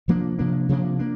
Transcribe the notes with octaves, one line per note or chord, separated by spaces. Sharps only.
C3 F3 A#3 D4
C3 F3 A#3 D4
C3 F3 A#3 D4
A#3 D4